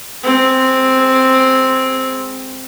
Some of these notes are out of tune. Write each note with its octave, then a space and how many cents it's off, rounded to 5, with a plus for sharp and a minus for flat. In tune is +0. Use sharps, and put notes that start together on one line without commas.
G#3 +0 C4 +0